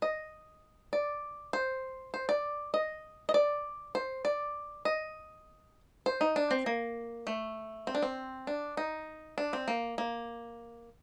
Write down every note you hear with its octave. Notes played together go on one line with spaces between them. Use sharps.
D#5
D5
C5
C5
D5
D#5
D#5
D5
C5
D5
D#5
C5
D#4
D4
C4
A#3
A3
C4
D4
C4
D4
D#4
D4
C4
A#3
A#3